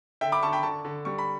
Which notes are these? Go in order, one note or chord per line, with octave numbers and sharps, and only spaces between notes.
D3 E5 G5
B5 D6
D3 A5 C#6
G5 B5
D3 A5 C#6
D3
G3 C#6
B5